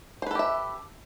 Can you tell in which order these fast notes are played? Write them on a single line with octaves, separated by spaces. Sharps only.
C5 B4 A4 G4 E5